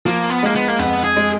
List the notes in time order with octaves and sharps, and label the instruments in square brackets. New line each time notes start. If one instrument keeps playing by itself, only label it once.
[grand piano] F3 [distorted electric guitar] A#3
[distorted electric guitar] B3
[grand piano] G#3 [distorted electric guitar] A#3
[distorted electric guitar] B3
A#3
[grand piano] F2 [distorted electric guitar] B3
[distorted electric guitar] G#4
[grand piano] G#3